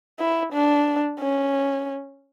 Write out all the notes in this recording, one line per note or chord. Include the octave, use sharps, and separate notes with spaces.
E4
D4
C#4